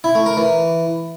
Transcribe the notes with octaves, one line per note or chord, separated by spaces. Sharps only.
E4
A3
A#4
E3